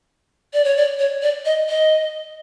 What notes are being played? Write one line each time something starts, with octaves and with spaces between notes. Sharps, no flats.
D5
C#5
D5
C#5
D5
D#5
D#5